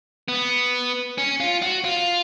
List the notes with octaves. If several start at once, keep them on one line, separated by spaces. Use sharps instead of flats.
B3
C#4
F4
F#4
F4